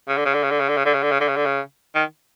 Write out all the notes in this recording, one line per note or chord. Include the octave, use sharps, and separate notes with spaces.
C#3
D3
C#3
D3
C#3
D3
C#3
D3
C#3
D3
C#3
D3
C#3
D3
C#3
D3
C#3
D#3